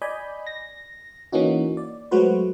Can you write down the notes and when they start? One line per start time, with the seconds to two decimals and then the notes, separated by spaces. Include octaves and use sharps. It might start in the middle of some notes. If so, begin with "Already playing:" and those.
0.02 D5 D#5 G#5 B5 G6
0.47 A#6
1.32 E3 A#3 C#4 D#4 F#4
1.77 D5
2.11 F#3 G#3 A3 F#4 B4 C5